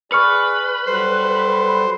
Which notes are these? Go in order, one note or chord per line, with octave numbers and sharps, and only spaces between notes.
G#4 B4 D5 C#6 F6 C#7
F#3 G3 A4 C5